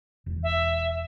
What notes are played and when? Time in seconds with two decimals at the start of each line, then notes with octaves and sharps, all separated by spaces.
0.26 E1
0.43 E5